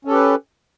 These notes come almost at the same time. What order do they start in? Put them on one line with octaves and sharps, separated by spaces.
C#4 A4 G4 B4